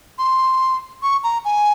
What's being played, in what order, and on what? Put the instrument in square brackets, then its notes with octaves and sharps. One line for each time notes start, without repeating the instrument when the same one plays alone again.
[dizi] C6
C#6
A#5
G#5